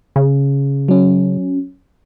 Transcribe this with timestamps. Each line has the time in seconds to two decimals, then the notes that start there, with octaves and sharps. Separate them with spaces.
0.16 C#3
0.88 F#3 C#4